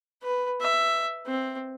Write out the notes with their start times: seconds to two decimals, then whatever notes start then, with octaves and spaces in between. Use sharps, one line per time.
0.23 B4
0.60 E5
1.27 C4